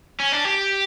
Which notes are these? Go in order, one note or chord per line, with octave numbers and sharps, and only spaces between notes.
C#4
D4
G4